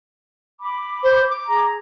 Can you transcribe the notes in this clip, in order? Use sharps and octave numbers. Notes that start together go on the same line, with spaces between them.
B5 D6
C5
D6
G#4 A#5